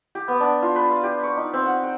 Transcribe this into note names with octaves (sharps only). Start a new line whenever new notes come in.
G4
B3
D4
F4
B4
F5
G4
C#6
D#4
C4
F#5
G5